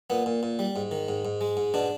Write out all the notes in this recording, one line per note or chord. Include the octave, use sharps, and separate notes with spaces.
A#2 B3
A#2
A#2
G3
G#2
D#3
G#2
G#2
G#3
G#2
B2 D4